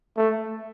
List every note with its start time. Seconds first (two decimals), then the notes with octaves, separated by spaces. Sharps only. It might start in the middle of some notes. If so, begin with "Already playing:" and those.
0.17 A3